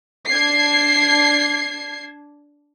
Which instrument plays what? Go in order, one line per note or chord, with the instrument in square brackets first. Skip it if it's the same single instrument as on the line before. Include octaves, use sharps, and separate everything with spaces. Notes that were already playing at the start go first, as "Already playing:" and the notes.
[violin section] D4 G#6 C7